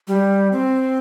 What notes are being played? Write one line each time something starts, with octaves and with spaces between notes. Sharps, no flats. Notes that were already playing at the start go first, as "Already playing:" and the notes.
G3
C4